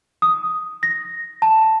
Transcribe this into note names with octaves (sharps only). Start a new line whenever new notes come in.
D#6
A#6
A5